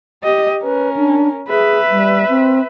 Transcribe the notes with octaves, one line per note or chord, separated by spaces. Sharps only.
G4 D#5
C#4 A#4 B4
D4
G#4 B4 E5
G3
C4